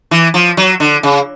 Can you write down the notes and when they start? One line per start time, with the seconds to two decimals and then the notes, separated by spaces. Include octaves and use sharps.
0.11 E3
0.34 F3
0.57 F#3
0.80 D3
1.03 C#3